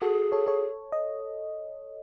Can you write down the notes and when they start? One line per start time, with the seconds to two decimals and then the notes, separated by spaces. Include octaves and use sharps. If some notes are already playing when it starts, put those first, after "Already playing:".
0.02 F#4 G#4 A4
0.32 A4 C#5
0.47 A4 C#5
0.92 D#5